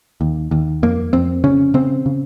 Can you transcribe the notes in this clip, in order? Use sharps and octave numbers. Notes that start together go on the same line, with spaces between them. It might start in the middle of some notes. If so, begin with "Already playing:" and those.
D#2
D#2
F2 A#3
F2 C4
C#3 C#4
C#3 C4
C#3